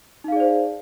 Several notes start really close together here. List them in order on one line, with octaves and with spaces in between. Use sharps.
D#4 F5 G#4 D5 C5